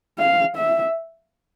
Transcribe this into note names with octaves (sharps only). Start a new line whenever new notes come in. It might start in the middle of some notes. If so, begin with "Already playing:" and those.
F5
E5